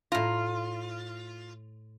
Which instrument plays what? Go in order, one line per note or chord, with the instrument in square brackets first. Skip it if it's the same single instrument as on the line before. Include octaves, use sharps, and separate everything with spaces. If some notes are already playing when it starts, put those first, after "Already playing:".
[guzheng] A2 A#5 [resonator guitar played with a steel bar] F4